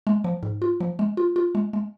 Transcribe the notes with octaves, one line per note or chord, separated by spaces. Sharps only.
G#3
F3
G#2
F4
F3
G#3
F4
F4
G#3
G#3